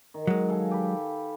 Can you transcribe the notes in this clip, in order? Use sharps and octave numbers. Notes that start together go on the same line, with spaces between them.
D#3
F#3 G#3
A4 F5 G#5
G4 B4